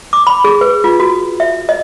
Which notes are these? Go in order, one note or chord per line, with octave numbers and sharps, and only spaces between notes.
D6
B5
G#4
B4
F4
F#4
E5
D#5